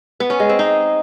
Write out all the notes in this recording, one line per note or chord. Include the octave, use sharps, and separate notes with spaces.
B3
C#4
G#3
C4
D#4